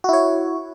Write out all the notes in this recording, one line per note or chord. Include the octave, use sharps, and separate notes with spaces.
E4 F#4 C#5